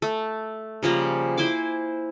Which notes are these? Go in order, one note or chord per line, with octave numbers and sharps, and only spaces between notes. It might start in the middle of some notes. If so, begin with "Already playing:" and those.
A3
C#3 F3 G3 A#3
E4 C5 G#5 D6